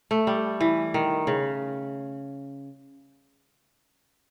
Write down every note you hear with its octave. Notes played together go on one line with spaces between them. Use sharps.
A3
G3
E3
D#3
C#3